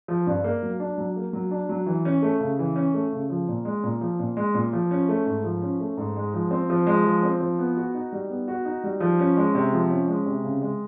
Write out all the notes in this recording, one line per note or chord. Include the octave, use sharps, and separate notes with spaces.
F3
G2
A#3
F#3
D4
F#3
A#3
F#3
D4
F#3
E3
C#4
A3
C#3
E3
C#4
A3
C#3
F3
A#2
G#3
A#2
F3
A#2
G#3
A#2
F3
C#4
A3
G#2
F3
C#4
A3
G#2
G#3
F3
C4
F3
G#3
F3
C4
F3
B3
F#4
D#4
G3
B3
F#4
D#4
G3
F3
C#4
G#3
C3
F3
C#4
G#3
C3
C#3
G#3